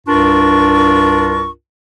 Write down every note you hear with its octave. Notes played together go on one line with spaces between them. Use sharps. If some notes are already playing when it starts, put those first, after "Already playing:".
C2 G2 D4 F4 A#4 C#6